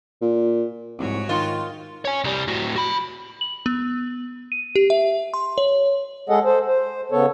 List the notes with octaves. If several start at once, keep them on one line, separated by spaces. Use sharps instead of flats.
A#2
C2 G#2 F#4 C#5
D#3 F4
C#5 G#5
C2 G3
A2 F#4
F#4 B5
F#7
B3
D#7
G4
E5
C6
C#5
G#3 G#4 A4 D#5 F#5
A4 C5
C5
C#3 B3 A4 C#5